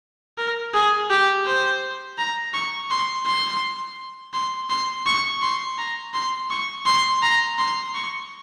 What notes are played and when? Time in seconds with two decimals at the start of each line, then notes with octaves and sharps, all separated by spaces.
0.38 A#4
0.74 G#4
1.10 G4
1.46 C5
2.18 A#5
2.53 C#6
2.90 C6
3.26 C6
4.33 C6
4.70 C6
5.06 C#6
5.42 C6
5.78 A#5
6.14 C6
6.51 C#6
6.86 C6
7.22 A#5
7.58 C6
7.94 C#6